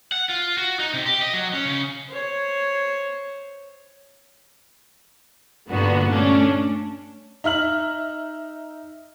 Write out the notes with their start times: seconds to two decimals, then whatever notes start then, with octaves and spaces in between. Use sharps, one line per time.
0.12 F#5
0.30 F4
0.58 F#4
0.79 D#4
0.93 C3
1.06 G4
1.21 D#5
1.34 F#3
1.53 C#4
1.65 C#3
2.10 C5 C#5
5.70 G2 A#2 D3 B3 F#4
6.10 A3 C#4 D4
7.44 D#4 E5 F6 F#7